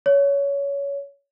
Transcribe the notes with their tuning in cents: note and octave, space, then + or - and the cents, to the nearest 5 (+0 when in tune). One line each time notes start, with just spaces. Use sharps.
C#5 +20